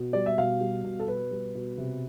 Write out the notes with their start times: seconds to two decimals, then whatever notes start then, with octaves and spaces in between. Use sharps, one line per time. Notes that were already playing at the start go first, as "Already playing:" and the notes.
Already playing: B2
0.13 G3 D5
0.26 E5
0.38 B2 F5
0.61 G3
0.84 B2
1.00 A4
1.08 B2 B4
1.31 G3
1.55 B2
1.78 C3